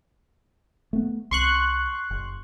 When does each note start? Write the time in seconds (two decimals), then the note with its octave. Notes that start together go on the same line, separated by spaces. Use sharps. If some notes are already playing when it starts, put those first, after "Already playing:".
0.93 A3 B3
1.31 C2 C6 C#6 F#6
2.10 F#1